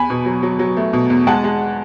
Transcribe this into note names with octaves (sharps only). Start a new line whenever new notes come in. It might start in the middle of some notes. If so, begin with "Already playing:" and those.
Already playing: E2 G#5 B5
B2
F#3
F#3
F#3
A3
B2
E2
G#3 F#5 A5
G#3